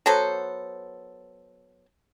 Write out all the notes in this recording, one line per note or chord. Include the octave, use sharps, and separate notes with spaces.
F#3 B3 A4 C5